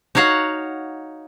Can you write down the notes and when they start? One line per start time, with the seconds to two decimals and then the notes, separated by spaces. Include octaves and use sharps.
0.15 D#4 F#4 C#5 F5 F#5